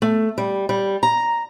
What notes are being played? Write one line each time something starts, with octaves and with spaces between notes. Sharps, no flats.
A3
G3
G3
A#5